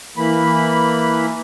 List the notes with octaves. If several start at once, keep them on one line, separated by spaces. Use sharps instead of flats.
E3 A#3 B5